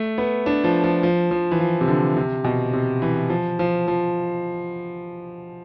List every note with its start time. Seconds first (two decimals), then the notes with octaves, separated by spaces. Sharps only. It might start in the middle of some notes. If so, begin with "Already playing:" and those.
Already playing: A3
0.18 B3
0.46 D4
0.64 F3
0.84 F3
1.03 F3
1.31 F3
1.51 E3
1.59 F3
1.81 C3
1.88 D3
2.17 C3
2.44 B2
2.73 C3
3.02 E3
3.30 F3
3.59 F3
3.88 F3